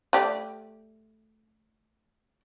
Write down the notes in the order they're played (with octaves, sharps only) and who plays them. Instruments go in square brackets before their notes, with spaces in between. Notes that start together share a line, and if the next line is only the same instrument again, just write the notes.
[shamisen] A3 G4 D5